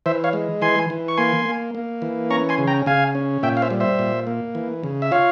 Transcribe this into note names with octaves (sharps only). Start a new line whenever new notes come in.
E3 C5 E5
C#5 F5
G#3
E3 G#5 C6
E3
C#6
A#3 G#5 C6
A#3
A#3
E3
C#4 A#5 C#6
G#5 C6
C#3
G5 A#5
C#3 F5 G#5
C#4
A#2 E5 G5
F5
C5 E5
G3
C5 E5
A#2
A#3
E3
C#3
E5
F4 C#5 F5